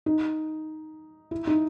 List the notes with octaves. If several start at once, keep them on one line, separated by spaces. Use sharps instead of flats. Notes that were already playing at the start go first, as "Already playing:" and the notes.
D#4
E4
D#4